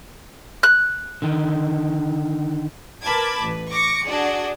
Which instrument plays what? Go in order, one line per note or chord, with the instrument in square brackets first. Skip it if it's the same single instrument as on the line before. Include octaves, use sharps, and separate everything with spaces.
[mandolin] F#6
[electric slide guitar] D3 D#3
[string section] A#4 B4 A5 B5 D6 G#6
A1 B4
C#6 D6 A#6 C#7
D4 F#4 G#4 D5